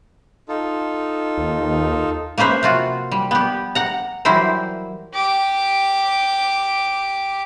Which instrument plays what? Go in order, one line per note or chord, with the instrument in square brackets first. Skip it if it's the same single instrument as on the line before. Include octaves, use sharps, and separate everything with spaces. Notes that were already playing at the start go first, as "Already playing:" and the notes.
[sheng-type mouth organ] D#4 F4 A4
[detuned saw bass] D#2
[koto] A#3 C#4 B4 C5 E5
C3 F4 F#4
G3
B3 G4
F#5 A#5
E3 F#3 G3 E4 A#4 C5
[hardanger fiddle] G4 D6